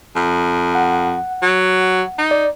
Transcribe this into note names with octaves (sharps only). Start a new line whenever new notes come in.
F2
F#5
F#3
D#4
D5